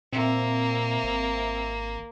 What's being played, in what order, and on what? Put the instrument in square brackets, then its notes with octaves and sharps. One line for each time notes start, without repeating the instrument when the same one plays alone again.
[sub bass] A#2 [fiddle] A#3 [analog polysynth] C4 E5
[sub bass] G#1